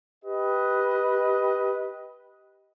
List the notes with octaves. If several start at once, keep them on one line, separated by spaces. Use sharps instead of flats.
G4 B4 D#5